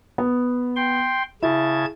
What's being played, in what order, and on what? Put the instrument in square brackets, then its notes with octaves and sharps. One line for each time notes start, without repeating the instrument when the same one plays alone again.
[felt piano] B3
[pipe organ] G5 C6
[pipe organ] C#3 A5 G#6 [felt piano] E4